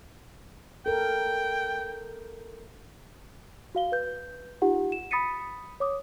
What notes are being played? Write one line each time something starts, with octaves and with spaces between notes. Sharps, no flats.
A4 A#4 G5
F#4 F5 G7
B4 G6
D#4 F4 G4 F#5
E7
B5 D#6 A6 B6 C#7 D#7
C#5 D6 D#6